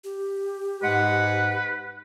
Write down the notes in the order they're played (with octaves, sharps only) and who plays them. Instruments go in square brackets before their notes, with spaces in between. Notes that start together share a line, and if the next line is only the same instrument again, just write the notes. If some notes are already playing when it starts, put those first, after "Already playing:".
[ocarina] G4
[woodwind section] G#2 G#3 F#5 [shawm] B4